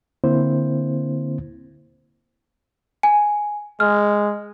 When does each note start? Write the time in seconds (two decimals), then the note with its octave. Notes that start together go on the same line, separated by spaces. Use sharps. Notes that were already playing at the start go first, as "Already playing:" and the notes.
0.24 D3 A#3 C4 E4 C5
3.03 G#5
3.80 G#3 F6